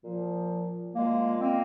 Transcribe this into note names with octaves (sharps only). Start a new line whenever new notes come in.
A#2 F3
A#2 F3 G#3 A#3
A#3 C4